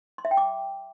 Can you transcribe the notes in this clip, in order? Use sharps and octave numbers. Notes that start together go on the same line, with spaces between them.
C6
E5
G5
D6